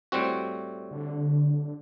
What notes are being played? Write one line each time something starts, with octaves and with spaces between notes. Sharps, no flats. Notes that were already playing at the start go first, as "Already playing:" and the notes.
A2 G3 C4 F#4
D3